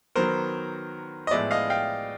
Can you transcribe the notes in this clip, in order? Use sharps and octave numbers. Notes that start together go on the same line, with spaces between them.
D#3 F#3 B3 A#4 C5
D#5
A2 F3 G#3 B3 D5 E5
D#5 F5
F5 G5